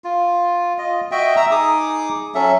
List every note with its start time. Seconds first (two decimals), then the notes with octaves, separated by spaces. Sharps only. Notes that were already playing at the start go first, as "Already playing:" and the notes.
0.04 F4
0.78 F4 D#5
1.11 F#4 D#5 E5 G5
1.36 E5 A#5 E6
1.51 D#4 G#4 D6 D#6
2.35 F#3 C#4 A4 E5